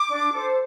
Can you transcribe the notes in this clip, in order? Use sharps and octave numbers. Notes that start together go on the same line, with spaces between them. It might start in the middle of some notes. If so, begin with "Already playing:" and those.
Already playing: D6
D4
A4 C5